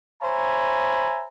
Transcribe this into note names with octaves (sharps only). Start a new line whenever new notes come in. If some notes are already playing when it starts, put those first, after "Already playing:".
C5 C#5 E5 G#5 A#5 B5